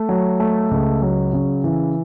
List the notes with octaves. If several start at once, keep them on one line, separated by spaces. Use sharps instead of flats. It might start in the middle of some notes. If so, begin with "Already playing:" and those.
Already playing: A3
F#3
A3
C#2
F#3
C#3
E3